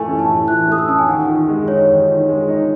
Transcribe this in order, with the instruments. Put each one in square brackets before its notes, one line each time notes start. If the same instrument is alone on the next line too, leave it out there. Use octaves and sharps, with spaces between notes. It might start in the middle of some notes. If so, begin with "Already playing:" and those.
Already playing: [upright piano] A2 E3 A3 [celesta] G#5
[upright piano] C#4
[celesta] A5
[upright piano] A2
[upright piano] E3 [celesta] F#6
[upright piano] A3 [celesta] D#6
[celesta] E6
[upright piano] C#4 [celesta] A5
[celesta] G#5
[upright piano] D#2 [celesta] F#5
[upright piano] D#3
G#3
[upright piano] D#4 [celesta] C#5
[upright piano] D#2
D#3
G#3
D#4